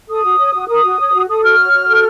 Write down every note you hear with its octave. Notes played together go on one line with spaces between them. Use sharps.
A4 D#6
F#4
C#5
F#4
A#4 D#6
F#4
C#5
F#4
A4 D#6
F#4 F6
C#5
F#4
A4